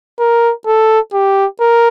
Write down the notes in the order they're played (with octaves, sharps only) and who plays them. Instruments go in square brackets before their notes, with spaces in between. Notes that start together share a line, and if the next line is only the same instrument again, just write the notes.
[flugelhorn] A#4
A4
G4
A#4